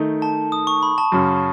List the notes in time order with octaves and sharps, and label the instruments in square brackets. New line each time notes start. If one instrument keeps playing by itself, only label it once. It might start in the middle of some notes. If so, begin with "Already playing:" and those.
Already playing: [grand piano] D#3 A3 D#4
[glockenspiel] A5
D#6
C#6
B5
A5
[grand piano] F#2 C#3 F#3 C#4